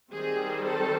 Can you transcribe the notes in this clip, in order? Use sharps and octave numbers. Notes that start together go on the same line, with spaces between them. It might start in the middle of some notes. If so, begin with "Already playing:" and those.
D#3 G3 C4 G#4
A4